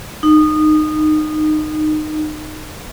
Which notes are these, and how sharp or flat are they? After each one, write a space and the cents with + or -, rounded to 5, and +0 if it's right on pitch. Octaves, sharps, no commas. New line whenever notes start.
D#4 -20